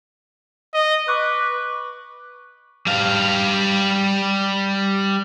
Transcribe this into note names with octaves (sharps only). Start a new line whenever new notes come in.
D#5
B4 C#6 D6 F#6
G3 F5